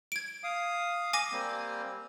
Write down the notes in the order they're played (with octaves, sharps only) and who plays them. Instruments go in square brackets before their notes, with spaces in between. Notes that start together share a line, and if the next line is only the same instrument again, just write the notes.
[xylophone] G#6 D7
[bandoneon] F5 D#6
[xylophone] G#5 D6 A#6
[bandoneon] G3 A#3 C4